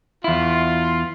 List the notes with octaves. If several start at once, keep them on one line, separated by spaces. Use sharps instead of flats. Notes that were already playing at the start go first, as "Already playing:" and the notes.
E2 E4 F4